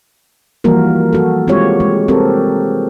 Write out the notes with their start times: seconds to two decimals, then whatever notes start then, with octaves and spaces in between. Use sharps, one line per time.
0.64 E3 F3 G3 A#3 F#4 A#4
1.13 F#4 A4
1.48 G#3 C4 F4 G4 C#5
1.80 G#3
2.08 C4 G4 A4 A#4